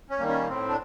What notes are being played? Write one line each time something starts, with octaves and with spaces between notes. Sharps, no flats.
C#4
D#3 G3 A#3
C#4
A2 C4
D4